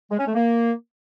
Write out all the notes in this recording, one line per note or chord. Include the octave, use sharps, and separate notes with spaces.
G#3
C#4
A3
A#3